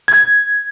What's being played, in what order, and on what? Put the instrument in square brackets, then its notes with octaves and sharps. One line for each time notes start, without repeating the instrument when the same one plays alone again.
[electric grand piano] G#6